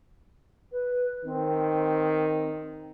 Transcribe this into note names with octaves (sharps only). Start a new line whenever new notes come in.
B4
D#3 C4